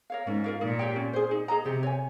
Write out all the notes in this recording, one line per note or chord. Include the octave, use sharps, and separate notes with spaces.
A#4 C#5 F5
G#2 C#4
F4 A#4 F5
A#2 D#4
G4 C#5 G5
C#4
G#4 C5
D#4
G#4 D#5 A#5
C3 G4
C#5 G#5